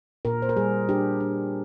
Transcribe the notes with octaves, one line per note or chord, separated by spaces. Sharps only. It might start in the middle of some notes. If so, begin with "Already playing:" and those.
A#2 A#4
C5
A#4
G3 G#4
D4 G4
D4